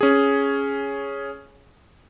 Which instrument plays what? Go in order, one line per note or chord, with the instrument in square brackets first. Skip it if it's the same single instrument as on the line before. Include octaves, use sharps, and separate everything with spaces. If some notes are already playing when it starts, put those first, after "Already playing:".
[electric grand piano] C#4 G#4